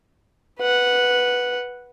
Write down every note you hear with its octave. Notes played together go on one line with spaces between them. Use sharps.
B4 F#5